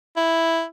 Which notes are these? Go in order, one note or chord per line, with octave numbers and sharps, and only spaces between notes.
E4